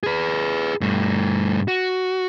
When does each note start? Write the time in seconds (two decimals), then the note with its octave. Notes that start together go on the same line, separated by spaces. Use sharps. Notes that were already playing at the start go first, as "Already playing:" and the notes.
0.03 G#4 B4
0.81 G2 A3
1.68 F#4